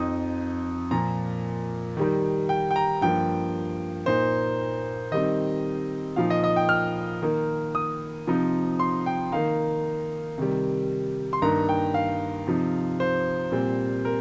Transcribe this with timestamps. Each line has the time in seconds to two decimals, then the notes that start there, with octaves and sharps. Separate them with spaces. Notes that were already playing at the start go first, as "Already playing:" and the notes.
Already playing: F2 F3 C4 D#4 D#6
0.91 A#2 F3 A#3 A#5
1.97 D#3 G3 D#4
2.49 G5
2.71 G5
2.76 A#5
3.01 G2 F3 A#3 G5
4.06 A#2 A#3 D#4 C5
5.12 D#3 G3 C4 D#4 D#5
6.16 A#2 F3 D#4 F5
6.30 D#5
6.44 D#5
6.56 G5
6.69 F6
7.22 D#3 A#3 D#4
7.75 D#6
8.27 C3 F3 C4 D#4
8.79 C6
9.06 G5
9.32 D#3 A#3 D#4 F5
10.38 C3 D#3 G3
11.33 C6
11.42 G2 D#3 A#3 D#4 A#5
11.69 G5
11.94 F5
12.47 C3 F3 D#4
13.00 C5
13.52 A#2 G3 C4
14.05 A#4